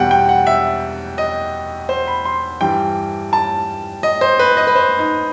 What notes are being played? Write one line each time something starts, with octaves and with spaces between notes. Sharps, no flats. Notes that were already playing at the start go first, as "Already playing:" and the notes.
Already playing: E2 B2 G3 F#5 G5
G5
F#5
E5
D#5
C5
B5
C6
G2 E3 G3 G5
A5
D#5
C5
B4
D#5
B4
C5
D#4